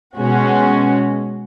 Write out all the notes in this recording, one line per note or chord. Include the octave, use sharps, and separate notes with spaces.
B2 G#3 C#4 F#4